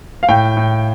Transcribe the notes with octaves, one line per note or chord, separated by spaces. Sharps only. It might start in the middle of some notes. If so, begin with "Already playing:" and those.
F5
A2 G5
A2